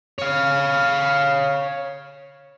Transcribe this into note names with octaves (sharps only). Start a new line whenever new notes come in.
C#5 F5